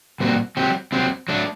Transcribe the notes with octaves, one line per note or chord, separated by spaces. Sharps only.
A#2 G3 C4 F#4
F#3 C4 G4
F#3 C4 G4
F#3 A3 D4